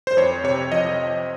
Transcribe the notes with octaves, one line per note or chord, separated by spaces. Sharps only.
C5
F2 C#5
C3 C#5
F3 D#5